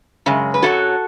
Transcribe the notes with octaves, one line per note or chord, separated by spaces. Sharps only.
F#2 C#3 G#3
B4
F#2 C#3 F#3 F#4 A4